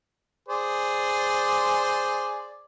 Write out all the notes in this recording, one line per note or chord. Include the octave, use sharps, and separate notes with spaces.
G#4 C5 D5